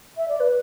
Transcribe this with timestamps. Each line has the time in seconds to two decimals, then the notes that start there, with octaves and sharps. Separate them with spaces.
0.17 E5
0.28 D5
0.40 B4